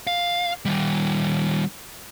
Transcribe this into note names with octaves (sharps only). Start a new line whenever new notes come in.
F5
D#3 G3